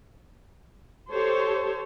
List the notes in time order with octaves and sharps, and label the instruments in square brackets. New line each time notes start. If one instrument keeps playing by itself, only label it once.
[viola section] G4 A4 C5 C#5